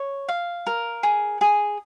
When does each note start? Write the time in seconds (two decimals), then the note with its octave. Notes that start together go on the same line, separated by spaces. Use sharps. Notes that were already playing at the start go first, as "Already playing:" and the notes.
Already playing: C#5
0.28 F5
0.67 A#4
1.03 G#4
1.41 G#4